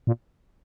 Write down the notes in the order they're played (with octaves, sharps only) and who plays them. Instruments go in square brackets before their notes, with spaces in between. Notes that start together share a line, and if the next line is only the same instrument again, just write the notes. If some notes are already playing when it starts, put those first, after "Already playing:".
[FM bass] A#2